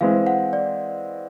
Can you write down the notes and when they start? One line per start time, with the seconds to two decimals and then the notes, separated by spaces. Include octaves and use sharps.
0.01 E3 G#3 C4 F5
0.27 F#5
0.53 D5